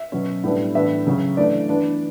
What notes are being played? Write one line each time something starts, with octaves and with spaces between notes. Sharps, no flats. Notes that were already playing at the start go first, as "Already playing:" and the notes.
Already playing: E5
B2 F#3 C#4
A2 G3 B3 D4
A2 E3 B3 D4 E5
C#3 F#3 C#4
E3 A3 D4 D5
E3 B3 D4